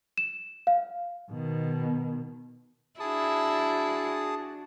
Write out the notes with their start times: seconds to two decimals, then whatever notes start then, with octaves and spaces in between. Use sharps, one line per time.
0.18 E7
0.67 F5
1.31 B2 D#3
3.00 D4 E4 F#4 G#4 A5 D#6